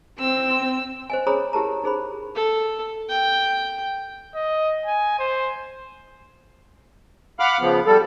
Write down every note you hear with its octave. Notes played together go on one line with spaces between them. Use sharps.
C4 E6
C5 D#5 G#5
G#4 C5 C#5 A#5 B5 D#6
E4 G4 A#4 A5 A#5
D#4 G#4 C5 B5
A4
G5
D#5
G#5
C5
F5 F#5 B5 D6 F6
C#3 F3 B3
G3 A4